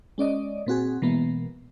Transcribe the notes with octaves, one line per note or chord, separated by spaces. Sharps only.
G#3 C#4 D5 D#5
A#2 C4 F#4 G#4
B2 E3 G#3 A#3 B3